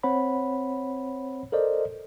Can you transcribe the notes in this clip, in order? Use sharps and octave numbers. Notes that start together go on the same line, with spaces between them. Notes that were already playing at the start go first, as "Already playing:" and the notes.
C4 C5 C#5 F#5 B5
A4 A#4 C5 D5 D#5